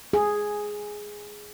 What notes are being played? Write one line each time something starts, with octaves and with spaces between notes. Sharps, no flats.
G#4